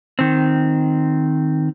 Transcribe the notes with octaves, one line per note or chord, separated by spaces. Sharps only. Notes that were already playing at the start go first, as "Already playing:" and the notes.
D#3 C4